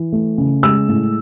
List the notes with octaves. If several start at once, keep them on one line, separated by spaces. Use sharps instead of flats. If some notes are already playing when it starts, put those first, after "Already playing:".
Already playing: E3
A3
C#3
G#3 E6
A2